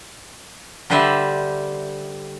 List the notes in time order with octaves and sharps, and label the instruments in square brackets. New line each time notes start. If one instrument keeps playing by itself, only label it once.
[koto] D3 G3 B4 C5 D5 E5